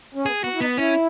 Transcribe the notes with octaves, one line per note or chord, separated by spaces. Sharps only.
C#4
B3 G#4
B3 F#4
E4
B3 D#4
C#4 E4